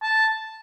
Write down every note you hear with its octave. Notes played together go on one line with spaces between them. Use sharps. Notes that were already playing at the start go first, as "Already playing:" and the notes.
A5